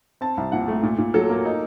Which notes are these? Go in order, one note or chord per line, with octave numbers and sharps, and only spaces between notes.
C4 A5
C2
A#2 F#5
A3
A#2
A#2
F#3 A4
A#3
D#4